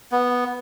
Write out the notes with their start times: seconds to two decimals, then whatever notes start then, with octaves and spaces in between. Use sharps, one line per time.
0.12 B3